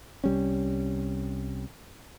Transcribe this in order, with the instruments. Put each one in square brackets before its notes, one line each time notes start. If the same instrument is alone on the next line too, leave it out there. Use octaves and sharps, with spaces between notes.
[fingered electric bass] C2 G3 C#4